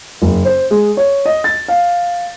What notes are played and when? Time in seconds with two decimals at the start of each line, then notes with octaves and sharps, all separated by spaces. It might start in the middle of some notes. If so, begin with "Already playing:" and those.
0.22 F#1
0.45 C5
0.71 G#3
0.97 C#5
1.26 D#5
1.44 A6
1.68 F5